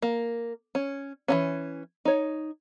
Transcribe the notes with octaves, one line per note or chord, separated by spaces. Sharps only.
A#3
C#4
E3 F3 C#4
D#4 C#5